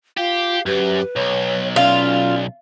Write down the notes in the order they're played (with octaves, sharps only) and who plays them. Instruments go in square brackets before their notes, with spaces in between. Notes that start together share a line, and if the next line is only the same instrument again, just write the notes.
[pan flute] F4 [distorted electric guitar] G4 [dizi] F5
[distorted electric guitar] F#2 [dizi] G4 [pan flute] B4
[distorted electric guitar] B1 [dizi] C#5
[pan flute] C#4 [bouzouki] F4 [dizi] D5